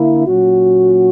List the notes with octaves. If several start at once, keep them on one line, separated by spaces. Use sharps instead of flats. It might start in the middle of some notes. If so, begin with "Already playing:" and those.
Already playing: D3 A#3 E4
A#2 F#3 C#4 F#4